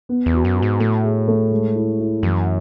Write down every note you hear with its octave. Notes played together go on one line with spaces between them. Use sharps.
B3
E2
F#4
F#2
F#4
G#2
A2 A3
G#4
A3
G#3
E4
E4
F#2 E3